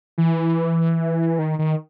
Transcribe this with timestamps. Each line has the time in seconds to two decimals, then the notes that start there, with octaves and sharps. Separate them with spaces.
0.18 E3
1.39 D#3
1.59 D#3